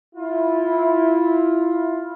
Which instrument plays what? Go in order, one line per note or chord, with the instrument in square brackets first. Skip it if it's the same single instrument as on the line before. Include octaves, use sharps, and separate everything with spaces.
[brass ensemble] E4 F4